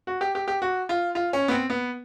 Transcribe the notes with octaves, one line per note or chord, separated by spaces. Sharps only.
F#4
G4
G4
G4
F#4
F4
F4
C#4
B3
C4
B3